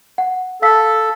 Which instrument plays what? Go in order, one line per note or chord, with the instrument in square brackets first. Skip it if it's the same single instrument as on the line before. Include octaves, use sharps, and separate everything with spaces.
[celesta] F#5
[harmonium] A4 [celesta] F5 E6 B6